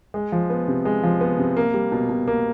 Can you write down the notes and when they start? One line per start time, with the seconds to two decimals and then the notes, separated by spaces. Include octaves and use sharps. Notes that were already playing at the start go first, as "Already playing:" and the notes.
0.14 G#3
0.32 F3
0.50 B3
0.68 C3
0.85 G#3
1.03 F3
1.21 B3
1.39 C3
1.57 A#3
1.74 G3
1.92 B2
2.09 B2
2.28 A#3